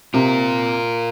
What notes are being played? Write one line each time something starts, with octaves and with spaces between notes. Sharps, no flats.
C3 F4 A#4